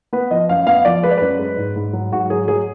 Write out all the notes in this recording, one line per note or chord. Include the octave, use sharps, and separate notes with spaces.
B3 B4
F3 D#5
F#2 F5
B3 F5
F3 D5
G#3 B4
D5
F#2 B4
G#3
G#2
G#2
F#3
G#2 F#4
F#3 G#4
F#3 G#4